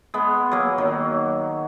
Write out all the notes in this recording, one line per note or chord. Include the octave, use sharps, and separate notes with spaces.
G#3 B3
F#3 A#3
D#3 F#3